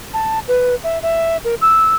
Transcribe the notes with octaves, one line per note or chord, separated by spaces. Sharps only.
A5
B4
E5
E5
A#4
E6